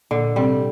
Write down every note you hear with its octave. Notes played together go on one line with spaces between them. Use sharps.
A#2 D3 A#3
C3 G3 C4